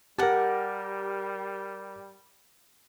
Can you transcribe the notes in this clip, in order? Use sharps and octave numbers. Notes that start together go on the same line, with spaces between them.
G3 G4 A#4 F#5 A5